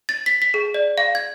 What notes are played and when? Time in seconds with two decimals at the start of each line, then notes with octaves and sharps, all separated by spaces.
0.09 A6
0.26 B6
0.42 B6
0.54 G#4
0.74 D5
0.98 F5
1.15 G#6